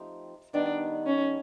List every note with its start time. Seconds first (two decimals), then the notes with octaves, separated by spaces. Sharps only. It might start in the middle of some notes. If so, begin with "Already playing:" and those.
Already playing: F3 A3 C4 D#4 G4
0.54 D#3 G3 B3 D4 D#4
1.06 C#4